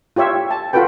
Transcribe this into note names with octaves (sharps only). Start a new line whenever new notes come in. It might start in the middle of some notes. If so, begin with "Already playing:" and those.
F4 G4 C#5 E5
A5
F4 F#4 A4 B4 G5